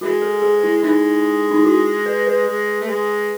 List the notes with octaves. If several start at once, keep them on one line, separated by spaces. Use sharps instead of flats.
E3 G#3 F#4
A4
G#4
E4
E3 G#3 D#4
D#4
E4
F#4
B4
B4
G#3
A3
G#3